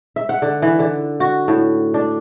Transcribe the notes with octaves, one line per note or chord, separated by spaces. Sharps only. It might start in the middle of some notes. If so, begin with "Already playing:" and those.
E5
F#5
D3
E3
D3
F#4
A2
D4